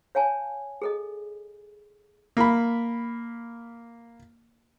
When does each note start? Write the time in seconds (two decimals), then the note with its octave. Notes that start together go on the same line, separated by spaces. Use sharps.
0.15 C#5 F5 G#5 A5
0.82 G#4 A4 D#5
2.37 A#3 B5